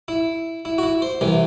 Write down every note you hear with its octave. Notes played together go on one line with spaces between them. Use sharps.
E4
E4
F#4
E4
C5
C2 C3 E3